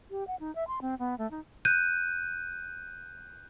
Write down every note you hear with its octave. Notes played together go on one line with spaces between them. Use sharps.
G4
F#5
D#4
E5
C6
C4
B3
A3
D#4
F#6 G6 D#7